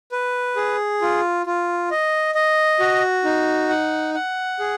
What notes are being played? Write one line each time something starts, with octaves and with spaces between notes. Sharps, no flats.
B4
G#4
F4
F4
D#5
D#5
F#4
D#4
F#5
F#5
G#4